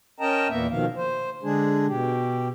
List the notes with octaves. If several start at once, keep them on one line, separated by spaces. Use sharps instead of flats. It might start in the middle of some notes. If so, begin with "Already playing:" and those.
C#4 A#4 D#5 G5 A5 A#5
E2 A#2 A#3 B3 E5
B2 D#3 F3 F5
C5
D3 G#3 D4 G#4
B2 G4